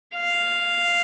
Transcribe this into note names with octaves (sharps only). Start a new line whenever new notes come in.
F5